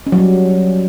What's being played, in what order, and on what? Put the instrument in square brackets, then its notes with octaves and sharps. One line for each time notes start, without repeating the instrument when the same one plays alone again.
[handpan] C#4
F#3
G3